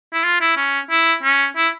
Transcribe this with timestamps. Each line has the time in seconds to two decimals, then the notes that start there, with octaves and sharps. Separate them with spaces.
0.13 E4
0.24 F4
0.41 E4
0.57 C#4
0.91 E4
1.23 C#4
1.56 E4